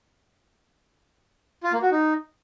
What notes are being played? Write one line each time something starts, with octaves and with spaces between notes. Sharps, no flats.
F4
A#3
F#4
D#4